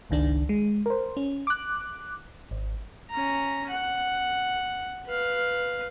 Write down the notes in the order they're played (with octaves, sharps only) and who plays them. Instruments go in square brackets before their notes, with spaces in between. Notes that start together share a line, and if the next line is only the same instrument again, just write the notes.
[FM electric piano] G1 C#2 D#3 D4
G#3
A#4 C5
C#4
D6 F#6
G#1
[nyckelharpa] C#4 A#5
F#5
B4 F5